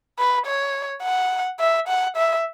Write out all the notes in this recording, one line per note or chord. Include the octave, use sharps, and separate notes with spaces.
B4
C#5
F#5
E5
F#5
E5